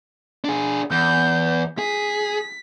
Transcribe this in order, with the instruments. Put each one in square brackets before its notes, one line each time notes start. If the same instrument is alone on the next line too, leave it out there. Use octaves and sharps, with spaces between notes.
[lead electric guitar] D4 G#4
[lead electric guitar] E2 [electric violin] G6
[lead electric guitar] G#4 [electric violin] B6